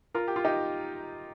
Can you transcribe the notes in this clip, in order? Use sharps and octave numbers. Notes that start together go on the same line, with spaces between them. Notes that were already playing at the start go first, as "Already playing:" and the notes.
F4 A#4
G4
F4
D#4 G4